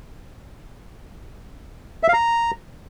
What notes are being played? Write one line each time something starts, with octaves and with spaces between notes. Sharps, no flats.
E5
F5
A#5